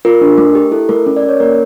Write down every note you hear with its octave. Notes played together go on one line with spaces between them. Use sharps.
F4 A#4
D4
A3
G4
E4 A4
A3 A#4
C#4 A#4
D5
C#4
C#5
A#3 A#4